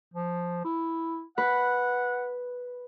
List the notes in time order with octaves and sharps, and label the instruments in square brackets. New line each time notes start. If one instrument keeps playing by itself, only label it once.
[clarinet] F3
E4
[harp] B4 [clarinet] F#5